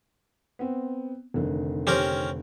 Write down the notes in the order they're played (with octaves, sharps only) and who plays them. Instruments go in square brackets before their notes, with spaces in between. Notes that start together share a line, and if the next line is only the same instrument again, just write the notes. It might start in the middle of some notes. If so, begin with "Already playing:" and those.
[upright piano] B3 C4
F1 D3 D#3
[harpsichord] C4 C#4 A#4 [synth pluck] G4 C5